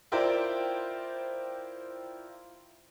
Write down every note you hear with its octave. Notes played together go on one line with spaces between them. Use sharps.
E4 F4 A#4 C5 D5 G5